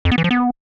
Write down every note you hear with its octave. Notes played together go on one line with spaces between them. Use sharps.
F2
B3
E3
F3
B3